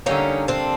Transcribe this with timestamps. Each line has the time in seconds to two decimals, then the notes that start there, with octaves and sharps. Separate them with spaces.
0.06 D3 G3 A#3 C#4 D#4
0.48 C4 D4